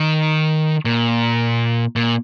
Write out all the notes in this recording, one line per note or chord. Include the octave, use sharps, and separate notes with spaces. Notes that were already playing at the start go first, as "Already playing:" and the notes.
Already playing: D#3
A#2
A#2